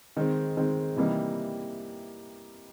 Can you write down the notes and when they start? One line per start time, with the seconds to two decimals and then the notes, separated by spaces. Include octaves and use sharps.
0.17 D#3 G#3 C4
0.57 D#3 G#3 C4
0.96 C3 E3 G3 A#3 D#4